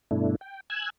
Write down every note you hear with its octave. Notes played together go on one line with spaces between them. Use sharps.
G2 B2 A3 D4 E4
G5
G#5 E6 F#6 G#6